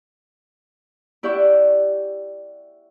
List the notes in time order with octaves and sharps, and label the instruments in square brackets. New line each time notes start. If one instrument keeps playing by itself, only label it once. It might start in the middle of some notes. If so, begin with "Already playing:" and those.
[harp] E4 G4 D5 F#5 C#6 E6